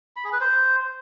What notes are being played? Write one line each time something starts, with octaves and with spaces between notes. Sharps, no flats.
B5
G#4
B4
C5